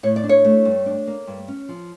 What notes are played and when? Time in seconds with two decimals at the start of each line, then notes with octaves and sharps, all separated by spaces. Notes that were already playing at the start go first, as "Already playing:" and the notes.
0.03 A2 C#5
0.16 D5
0.24 D4
0.29 C#5
0.45 A3
0.65 G2
0.86 D4
1.07 A#3
1.27 G2
1.48 C#4
1.69 F3